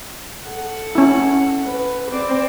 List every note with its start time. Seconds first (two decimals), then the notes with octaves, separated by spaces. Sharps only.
0.48 A4 F#5
0.95 C#4 E4
1.66 B4
2.11 C4 D5